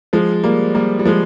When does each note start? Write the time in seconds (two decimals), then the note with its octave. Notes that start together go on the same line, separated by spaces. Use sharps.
0.13 F3 G#3
0.44 G3 A#3
0.75 G3 A#3
0.99 G3
1.05 F3 G#3